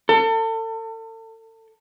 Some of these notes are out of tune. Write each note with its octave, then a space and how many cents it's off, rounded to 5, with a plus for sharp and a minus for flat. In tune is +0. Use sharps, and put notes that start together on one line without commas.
A4 +35